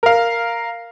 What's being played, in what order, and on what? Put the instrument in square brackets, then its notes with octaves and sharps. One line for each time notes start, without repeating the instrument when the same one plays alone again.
[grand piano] A#4 F5